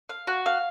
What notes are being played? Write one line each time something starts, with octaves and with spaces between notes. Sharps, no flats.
F5
F#4
F5